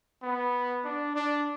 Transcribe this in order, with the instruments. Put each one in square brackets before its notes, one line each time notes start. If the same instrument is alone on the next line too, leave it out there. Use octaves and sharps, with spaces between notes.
[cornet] B3
D4
D4